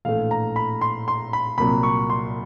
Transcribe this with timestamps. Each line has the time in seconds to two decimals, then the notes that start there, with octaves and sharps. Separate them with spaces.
0.05 A#1 A2 E3 A3 F5
0.31 A#5
0.56 B5
0.81 C6
1.08 C6
1.33 B5
1.58 C2 A#2 F#3 B5
1.83 C#6
2.10 C6